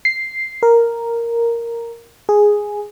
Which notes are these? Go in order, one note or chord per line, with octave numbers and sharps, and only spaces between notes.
C7
A#4
G#4